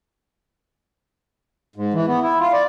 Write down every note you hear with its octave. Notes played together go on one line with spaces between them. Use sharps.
G#2
E3
B3
E4
F4
D5